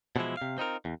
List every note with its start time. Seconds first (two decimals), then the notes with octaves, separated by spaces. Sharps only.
0.16 B2 D3 E3 F3 G#3 E4
0.37 C3 F5
0.58 C4 D#4 F4 A#4
0.85 E2